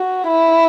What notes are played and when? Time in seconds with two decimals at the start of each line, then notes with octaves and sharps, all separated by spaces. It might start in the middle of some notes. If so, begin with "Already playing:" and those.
Already playing: F#4
0.27 E4